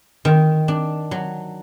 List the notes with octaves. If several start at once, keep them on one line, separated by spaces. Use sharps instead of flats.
D#3
D4
F#3